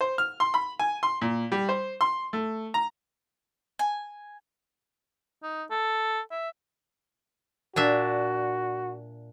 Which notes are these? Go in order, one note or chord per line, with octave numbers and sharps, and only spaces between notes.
C5
F6
C6
B5
G#5
C6
A#2
G3
C5
C6
A3
A#5
G#5
D#4
A4
E5
A#2 D4 F#4 E5